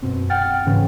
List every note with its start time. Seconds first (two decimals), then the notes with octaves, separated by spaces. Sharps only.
0.02 F#2 B2 C4
0.30 F#5 G5 F6 A6
0.66 G#2 C#3 E3 C#4